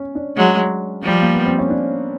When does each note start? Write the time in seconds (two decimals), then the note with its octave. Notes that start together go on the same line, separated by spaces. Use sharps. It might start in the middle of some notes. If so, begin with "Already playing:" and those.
Already playing: C#4
0.15 D4
0.37 F#3 G#3
1.03 F3 G3
1.22 A#3
1.34 B3
1.46 C4
1.59 C#4
1.70 D4